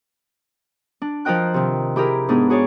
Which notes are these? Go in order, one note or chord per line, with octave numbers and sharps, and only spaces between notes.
D4
F3 F4 A#4 D#5 G5 F#6
C3 D#3
E4 G4 G#4 A#4
G#2 B3 D4 D#4 G#4
F#4 G#4 C#5 D5